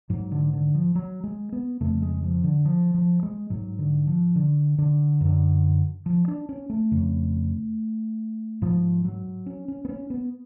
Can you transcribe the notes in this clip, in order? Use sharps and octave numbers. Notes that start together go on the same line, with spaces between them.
G#2 F#3
D3
D3
F3
F#3
G#3
B3
F2 C#3 A3
G#3
F3
D3
F3
F3
G#3
G#2 F#3
D3
F3
D3
D3
F#2 D3
F3
D4
C#4
A3
F2 C#3
G#2 F3
F#3
C#4
C#4
B3
C#4
B3